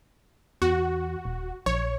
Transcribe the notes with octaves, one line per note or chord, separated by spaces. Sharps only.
E2 F#4
D#1
A#1 C#5